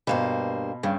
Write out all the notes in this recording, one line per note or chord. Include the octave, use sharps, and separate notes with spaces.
G2 B2 A#3 C5
G2 C#3